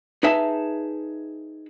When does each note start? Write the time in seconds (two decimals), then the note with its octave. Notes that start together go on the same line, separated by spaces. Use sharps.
0.23 D#4 G#4 B4 E5 A5